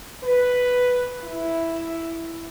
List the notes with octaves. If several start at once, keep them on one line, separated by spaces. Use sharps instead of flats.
B4
E4